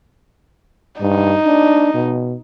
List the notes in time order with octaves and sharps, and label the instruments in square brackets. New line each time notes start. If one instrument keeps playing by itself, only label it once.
[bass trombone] G2 [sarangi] D#4
[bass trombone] D4
B2